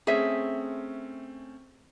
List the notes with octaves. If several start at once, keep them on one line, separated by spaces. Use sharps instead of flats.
A3 C4 C#4 G#4 E5